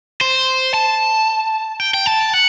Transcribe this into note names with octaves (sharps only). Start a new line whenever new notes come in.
C5
A5
G5
G5
A5
F#5